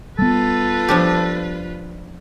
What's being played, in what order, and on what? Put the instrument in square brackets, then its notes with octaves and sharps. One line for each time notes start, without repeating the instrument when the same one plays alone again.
[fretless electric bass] G3 B3 [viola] F4 B4 [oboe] A4
[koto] F3 D4 G4